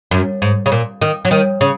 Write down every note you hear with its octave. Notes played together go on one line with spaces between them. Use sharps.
F#2
G#2
C#3
A#2
D#3
F#3
D#3
C#3